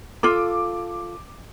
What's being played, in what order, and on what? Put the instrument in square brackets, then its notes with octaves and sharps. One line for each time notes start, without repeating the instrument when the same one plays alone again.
[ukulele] F4 A4 [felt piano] D6